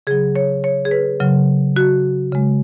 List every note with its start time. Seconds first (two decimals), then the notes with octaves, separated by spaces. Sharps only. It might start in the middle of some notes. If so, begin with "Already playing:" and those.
0.07 C#3 G#4
0.11 F#3
0.36 C#5
0.64 C#5
0.85 G#4
0.91 B4
1.20 C#3 F#3
1.76 F#4
2.32 C#3 G#3